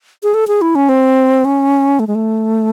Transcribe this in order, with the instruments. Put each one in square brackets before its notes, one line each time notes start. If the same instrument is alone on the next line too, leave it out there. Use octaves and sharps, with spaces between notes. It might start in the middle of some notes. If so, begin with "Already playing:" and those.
[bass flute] G#4
A4
G#4
E4
C#4
C4
C#4
A3
G#3
A3